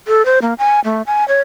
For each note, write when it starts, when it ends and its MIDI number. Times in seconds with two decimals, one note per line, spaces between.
0.08 0.25 69
0.25 0.39 72
0.42 0.54 58
0.59 0.80 80
0.84 1.02 57
1.07 1.27 80
1.28 1.40 73